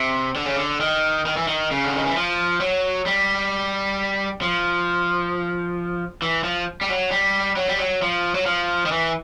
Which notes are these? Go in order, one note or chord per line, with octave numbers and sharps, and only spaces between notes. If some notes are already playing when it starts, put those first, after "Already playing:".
Already playing: C3
D3
C#3
D3
D#3
D#3
E3
D#3
C#3
D3
D#3
E3
F3
F#3
G3
F3
E3
F3
G3
F#3
G3
F#3
G3
F#3
F3
F#3
F3
D#3
E3